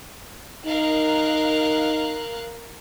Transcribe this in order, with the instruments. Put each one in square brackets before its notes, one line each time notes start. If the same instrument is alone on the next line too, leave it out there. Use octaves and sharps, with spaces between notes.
[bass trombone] D#4 [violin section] A#4 F5 F#6